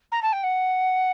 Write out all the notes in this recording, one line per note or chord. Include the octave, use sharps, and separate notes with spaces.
A#5
A5
G5
F#5